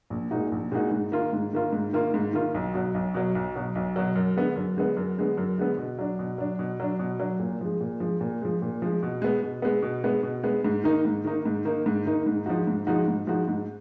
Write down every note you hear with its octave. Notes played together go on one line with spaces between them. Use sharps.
A#1
A#2 G#3 D#4 F#4
A#1
A#2 G#3 D#4 F#4
G#2
D#3 A#3 F4
G#2
D#3 A#3 F4
G#2
D#3 A#3 F4
G#2
D#3 A#3 F4
B1
B2 F#3
B1
B2 F#3
B1
B2 F#3
B1
B2 F#3
F#2
D3 G#3 B3
F#2
D3 G#3 B3
F#2
D3 G#3 B3
F#2
D3 G#3 B3
B2
F#3 D4
B2
F#3 D4
B2
F#3 D4
B2
F#3 D4
A#2
F3 G#3
A#2
F3 G#3
A#2
F3 G#3
A#2
F3 G#3
B2
G#3 B3
B2
G#3 B3
B2
G#3 B3
B2
G#3 B3
G#2
D#3 A#3 D#4
G#2
D#3 A#3 D#4
G#2
D#3 A#3 D#4
G#2
D#3 A#3 D#4
G#2
F3 G#3 D#4 F#4
G#2
F3 G#3 D#4 F#4
G#2
F3 G#3 D#4 F#4
G#2